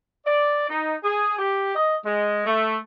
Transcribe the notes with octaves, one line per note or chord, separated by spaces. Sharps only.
D5
D#4
G#4
G4
D#5
G#3
A3